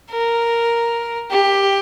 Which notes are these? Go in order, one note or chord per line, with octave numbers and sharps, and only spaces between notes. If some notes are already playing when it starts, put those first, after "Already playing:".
A#4
G4